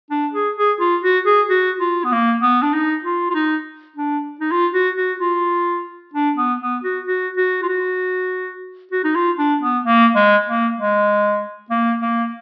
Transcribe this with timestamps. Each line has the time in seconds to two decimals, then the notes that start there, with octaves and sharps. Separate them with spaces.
0.10 D4
0.33 G#4
0.57 G#4
0.80 F4
1.03 F#4
1.26 G#4
1.50 F#4
1.80 F4
2.04 B3
2.12 A#3
2.42 B3
2.62 D4
2.74 D#4
3.04 F4
3.30 F4
3.34 D#4
3.96 D4
4.40 D#4
4.51 F4
4.74 F#4
4.97 F#4
5.20 F4
6.14 D4
6.37 B3
6.61 B3
6.83 F#4
7.07 F#4
7.37 F#4
7.63 F4
7.69 F#4
8.91 F#4
9.04 D#4
9.15 F4
9.38 D4
9.62 B3
9.84 A#3
10.15 G#3
10.46 A#3
10.78 G#3
11.70 A#3
12.02 A#3